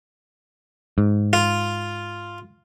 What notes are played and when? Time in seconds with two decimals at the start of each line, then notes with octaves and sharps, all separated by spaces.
0.98 G#2
1.33 F4